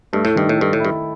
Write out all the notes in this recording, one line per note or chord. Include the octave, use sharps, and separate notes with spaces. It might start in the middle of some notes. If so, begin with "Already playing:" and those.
G2 A3
A2
G2 D#3
A2
G2 A4
A2
G2 E4